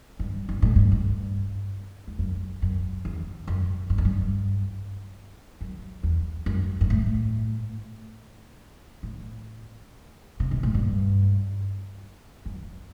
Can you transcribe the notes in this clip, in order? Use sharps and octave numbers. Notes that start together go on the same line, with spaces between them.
G2
G2
A2
G2
G2
E2
F#2
F#2
E2
F#2
G2
F#2
G2
F#2
E2
F#2
G2
A2
A2
C3
B2
A2
G2
F#2